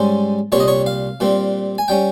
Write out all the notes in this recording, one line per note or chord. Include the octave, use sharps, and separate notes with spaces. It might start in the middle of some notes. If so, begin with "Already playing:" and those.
Already playing: G#2 G3 C#4 C5
C2 A#2 G3 C#5
D#5
C#5
F5
A#2 G3 C4
G#5
G3 C#4 G5